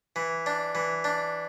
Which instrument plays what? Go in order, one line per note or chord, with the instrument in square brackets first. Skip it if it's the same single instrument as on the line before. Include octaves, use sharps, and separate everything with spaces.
[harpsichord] E3
D4
E3
D4